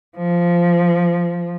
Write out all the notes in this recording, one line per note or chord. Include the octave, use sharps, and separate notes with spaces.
F3